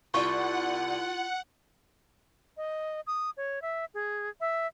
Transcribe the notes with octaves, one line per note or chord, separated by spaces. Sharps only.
C2 F4 D5 F#5 C#6
D#5
D#6
C#5
E5
G#4
E5